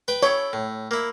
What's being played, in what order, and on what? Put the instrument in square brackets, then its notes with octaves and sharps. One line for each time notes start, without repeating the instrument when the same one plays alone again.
[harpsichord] B4 G5
[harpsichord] E4 A4 G5 [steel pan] C#5
[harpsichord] A2
A#3 E4